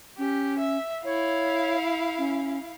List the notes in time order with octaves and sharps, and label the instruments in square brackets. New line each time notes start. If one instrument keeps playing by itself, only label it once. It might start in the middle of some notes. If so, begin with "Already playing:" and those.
[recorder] C#4 [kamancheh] G4
[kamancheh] E5
[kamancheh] E4 F5 [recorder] C#5
[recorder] C#4